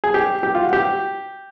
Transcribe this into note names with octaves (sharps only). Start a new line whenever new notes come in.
G#4
G4
G4
F4
F#4
G4